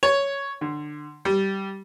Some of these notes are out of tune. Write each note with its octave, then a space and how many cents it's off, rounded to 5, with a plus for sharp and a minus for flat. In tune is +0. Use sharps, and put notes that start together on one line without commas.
C#5 +5
D3 +25
G3 -10